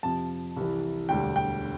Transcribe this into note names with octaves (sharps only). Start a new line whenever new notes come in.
F2 C3 F3 A5
C2 C3 E3
E1 D2 D3 G3 G5
G5